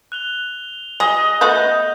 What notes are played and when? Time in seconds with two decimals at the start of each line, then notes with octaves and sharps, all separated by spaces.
0.12 F#6 F7 G7
1.00 G#4 D#5
1.41 A3 B3 F#4 G6